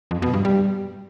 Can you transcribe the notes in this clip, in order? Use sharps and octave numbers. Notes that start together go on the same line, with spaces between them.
F2
B2
G2
G3